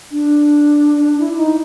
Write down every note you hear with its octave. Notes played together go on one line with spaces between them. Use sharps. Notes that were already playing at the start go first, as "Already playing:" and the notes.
D4
E4
E4
D#4